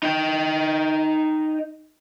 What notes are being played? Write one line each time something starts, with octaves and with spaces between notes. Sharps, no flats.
D#4 G5